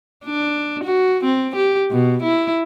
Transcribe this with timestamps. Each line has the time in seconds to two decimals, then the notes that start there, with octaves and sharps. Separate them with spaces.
0.25 D4
0.84 F#4
1.24 C4
1.56 G4
1.91 B2
2.23 E4